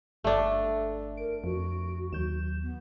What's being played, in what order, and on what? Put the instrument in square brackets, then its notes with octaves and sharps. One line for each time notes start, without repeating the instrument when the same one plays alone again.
[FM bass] G1 [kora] A3 D4 [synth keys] A4 D5 E5
[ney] A#4 [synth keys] D7
[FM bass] F2 [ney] F#4
[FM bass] D#2 [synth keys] F#3 G6 E7
[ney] B3